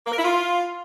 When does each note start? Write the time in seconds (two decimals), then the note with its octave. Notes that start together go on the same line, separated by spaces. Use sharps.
0.06 A#3
0.12 A#4
0.19 E4
0.25 F4